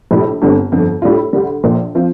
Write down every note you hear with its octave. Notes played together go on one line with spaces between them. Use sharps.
A#1 A2 G3
G1 G2 D3 G3 C4
G1 F2 D3
A2 G3 D4 F4
D2 D3 G3
A#1 A#2 F3
F3 C4 F4